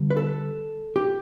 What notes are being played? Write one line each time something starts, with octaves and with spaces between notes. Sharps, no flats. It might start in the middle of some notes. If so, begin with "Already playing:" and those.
Already playing: D3 G3 B3
B4
A4
G4